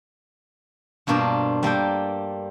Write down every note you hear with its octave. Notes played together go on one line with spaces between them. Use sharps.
G2 B2 A#3 D4 F4 C5
G3 A#3 A4 G5